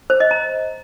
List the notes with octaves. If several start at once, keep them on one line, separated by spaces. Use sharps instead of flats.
C5
D#5
A#5